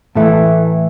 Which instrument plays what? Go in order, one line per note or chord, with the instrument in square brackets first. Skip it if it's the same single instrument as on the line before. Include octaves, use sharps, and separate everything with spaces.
[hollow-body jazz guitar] A2 E3 A3 E4